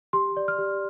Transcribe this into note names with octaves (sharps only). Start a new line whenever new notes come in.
G4 C6
D5
F6
G4